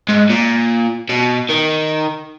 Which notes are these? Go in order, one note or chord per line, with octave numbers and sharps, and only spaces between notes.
G#2
A#2
B2
D#3